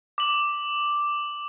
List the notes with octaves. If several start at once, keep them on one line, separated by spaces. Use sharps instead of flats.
D6 F#7